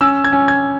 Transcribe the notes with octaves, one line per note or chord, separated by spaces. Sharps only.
C#4 E6
G#6
C#4
G#6